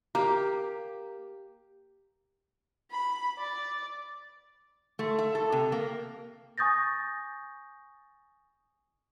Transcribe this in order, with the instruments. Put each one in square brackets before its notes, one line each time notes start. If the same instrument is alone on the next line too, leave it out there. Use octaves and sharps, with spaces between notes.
[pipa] A#3 [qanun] G4
[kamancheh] B5
D5
[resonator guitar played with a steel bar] A3
E5
A4
C3
A#3
[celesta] G#5 C#6 D#6 G6 A6 A#6